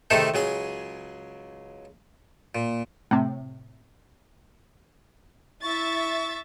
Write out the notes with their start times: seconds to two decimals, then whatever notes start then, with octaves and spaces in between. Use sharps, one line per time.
0.10 C3 D#3 A3 D#4 G#4 A4
0.34 C#2 F#3 G#4 G#5
2.55 A#2
3.11 A2 C3
5.63 E4 E5 C#6 A6